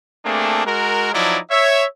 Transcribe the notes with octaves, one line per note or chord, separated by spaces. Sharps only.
A3 A#3 C4 D4 G#4
G#3 F#4 A#4
F3 F#3 D#4 E4 D5
C#5 E5